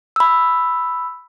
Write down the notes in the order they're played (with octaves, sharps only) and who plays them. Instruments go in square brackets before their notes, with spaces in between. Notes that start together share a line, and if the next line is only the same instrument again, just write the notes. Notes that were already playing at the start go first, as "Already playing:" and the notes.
[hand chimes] B5 E6